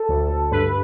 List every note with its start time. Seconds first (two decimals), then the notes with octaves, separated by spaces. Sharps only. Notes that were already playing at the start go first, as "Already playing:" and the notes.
Already playing: A4
0.09 D2
0.31 D2
0.52 G2 B4